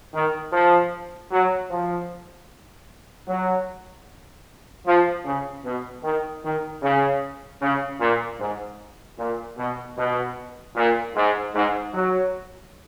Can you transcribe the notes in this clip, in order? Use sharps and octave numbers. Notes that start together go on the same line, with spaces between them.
D#3
F3
F#3
F3
F#3
F3
C#3
B2
D#3
D#3
C#3
C#3
A#2
G#2
A#2
B2
B2
A#2
G#2
G#2
F#3